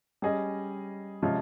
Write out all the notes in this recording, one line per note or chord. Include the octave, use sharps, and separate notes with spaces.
G3 C#4 G#4 D#5
C3 F3 G#3 C#4 F4